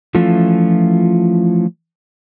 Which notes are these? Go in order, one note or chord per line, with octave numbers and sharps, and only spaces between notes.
E3 F3 A3 C#4 F4